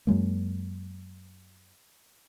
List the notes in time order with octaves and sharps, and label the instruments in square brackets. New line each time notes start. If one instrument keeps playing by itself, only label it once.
[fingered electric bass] F#2 F#3 G#3 A#3